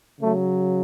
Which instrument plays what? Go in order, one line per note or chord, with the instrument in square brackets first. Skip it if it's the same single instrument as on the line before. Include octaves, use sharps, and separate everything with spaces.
[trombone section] C#3 F#3 A3